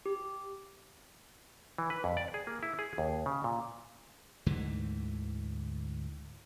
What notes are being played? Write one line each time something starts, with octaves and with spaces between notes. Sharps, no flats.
G4
E3
B4
F2
D5
G#4
A#3
E4
G#4
D#2
C#3
A#2
D2 G#2 D3 E3